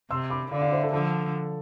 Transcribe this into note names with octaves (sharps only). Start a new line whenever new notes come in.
C3 C6 E6
B5 D6
D3 D5 F5
D5 F5
C5 E5
A4 C5
D3 F3 A4